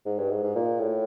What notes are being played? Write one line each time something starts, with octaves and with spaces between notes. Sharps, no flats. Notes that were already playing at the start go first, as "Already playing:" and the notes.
G#2
G2
G#2
G#2
A#2
A2